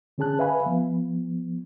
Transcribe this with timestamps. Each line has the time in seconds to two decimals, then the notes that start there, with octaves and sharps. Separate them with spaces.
0.18 D3 C#4 G#4 A5 F#6
0.39 B4 E5 F5 G#5 B5
0.66 F3 B3